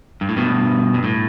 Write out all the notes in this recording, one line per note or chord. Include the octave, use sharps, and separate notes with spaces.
G2
A2
G2 B2
G2
A2